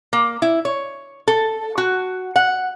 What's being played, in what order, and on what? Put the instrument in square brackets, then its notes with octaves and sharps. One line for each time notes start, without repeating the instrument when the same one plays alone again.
[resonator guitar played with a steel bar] A#3
E4
C#5
A4
F#4
F#5